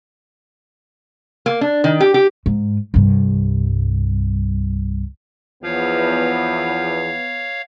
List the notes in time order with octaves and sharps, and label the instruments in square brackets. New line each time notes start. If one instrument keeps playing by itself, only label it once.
[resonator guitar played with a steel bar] A#3
D4
D#3
G4
G4
[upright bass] G#2
C2 G2
[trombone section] E2 [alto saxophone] F3 [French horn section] B3 [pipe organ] C#5 F5